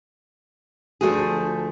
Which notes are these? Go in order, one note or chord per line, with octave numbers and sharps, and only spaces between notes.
D2 A2 F3 A3 F#4 G#4